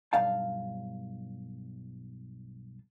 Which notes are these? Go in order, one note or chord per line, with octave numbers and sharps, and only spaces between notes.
B1 G2 F5 A5